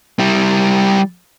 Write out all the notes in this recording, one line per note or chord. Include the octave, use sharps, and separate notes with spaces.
G3 E4